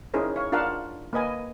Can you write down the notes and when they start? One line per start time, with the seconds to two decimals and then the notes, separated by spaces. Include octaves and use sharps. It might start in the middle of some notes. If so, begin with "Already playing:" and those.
0.14 C#4 D#4 E4 G#4 A#4 C5
0.36 C#5 F5
0.52 D4 F4 A#4 F5 F#5 A5
1.13 A#3 B4 D#5 G#5